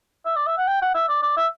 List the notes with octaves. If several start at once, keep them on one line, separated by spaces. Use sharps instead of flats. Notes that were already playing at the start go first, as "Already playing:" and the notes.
E5
D5
E5
F#5
G5
F#5
E5
D5
D5
E5